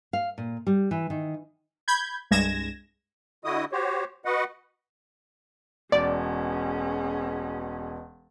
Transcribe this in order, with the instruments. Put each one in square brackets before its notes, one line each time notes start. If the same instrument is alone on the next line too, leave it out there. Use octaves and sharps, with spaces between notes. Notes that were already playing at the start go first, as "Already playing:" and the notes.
[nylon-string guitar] F5
A#2
G3
E3
D#3
[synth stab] B5 G6 G#6
C2 G2 G#3 G#6 A#6 E7
[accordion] D3 E4 F#4 D#5 D#6
F#4 G4 C5 C#5
F#4 B4 D#5 F#5
[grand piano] E1 [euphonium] B2 [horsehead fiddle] C#4 G#4 [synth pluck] D5